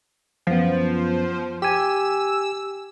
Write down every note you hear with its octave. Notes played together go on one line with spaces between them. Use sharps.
F#2 F3 B3
G4 G#5 E6